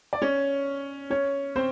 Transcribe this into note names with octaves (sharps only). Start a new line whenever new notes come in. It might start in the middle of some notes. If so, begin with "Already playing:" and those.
D5
C#4 C#5
C#4 C#5
C4 C5